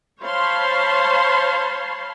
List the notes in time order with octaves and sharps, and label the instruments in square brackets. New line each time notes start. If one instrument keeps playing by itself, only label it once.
[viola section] C5 C#5 F5 A5 B5 C6